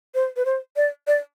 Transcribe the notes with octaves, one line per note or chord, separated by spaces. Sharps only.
C5
B4
C5
D5
D5